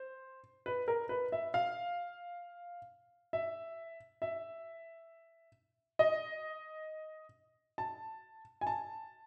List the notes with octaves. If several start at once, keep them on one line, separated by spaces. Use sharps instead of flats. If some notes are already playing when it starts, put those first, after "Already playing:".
Already playing: C5
B4
A#4
B4
E5
F5
E5
E5
D#5
A5
G#5
A5